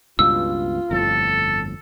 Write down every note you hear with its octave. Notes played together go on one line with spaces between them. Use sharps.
C#2 G2 B2 F4 E6
G1 F2 A2 A4